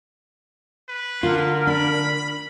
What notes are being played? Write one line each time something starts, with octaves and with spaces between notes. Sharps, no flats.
B4
D3 F4 A#4
D4 B5